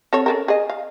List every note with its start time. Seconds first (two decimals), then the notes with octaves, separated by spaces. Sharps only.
0.13 C4 A4 C#5
0.26 C#4 A4 A#4
0.48 G#4 D#5
0.70 F5